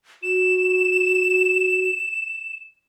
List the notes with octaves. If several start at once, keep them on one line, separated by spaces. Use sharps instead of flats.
F#4 E7